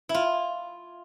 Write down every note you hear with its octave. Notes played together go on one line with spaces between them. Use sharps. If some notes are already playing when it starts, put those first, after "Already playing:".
E4
F4